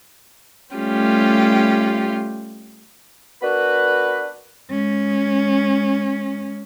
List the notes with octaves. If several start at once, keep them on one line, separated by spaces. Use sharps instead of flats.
G3 A3 C#4 F4 G4
B3 D4 F#4 A#4 B4
G#3 C#4